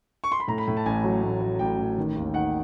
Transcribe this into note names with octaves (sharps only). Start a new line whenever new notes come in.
C#6
C6
B5
A2 A#5
B5
A2
A5
A1 G#5
F#3
A1
F#3
A1 G5
A1
D#3
D#2
D#3 F#5